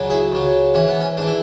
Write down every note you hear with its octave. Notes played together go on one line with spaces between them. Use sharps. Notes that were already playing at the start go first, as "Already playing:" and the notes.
Already playing: C#2 C#3 F#3
E4 G#4
C#2 C#3 F#3
G#2 E3 C#4
B3
C#4
G#2 E3 D4
E4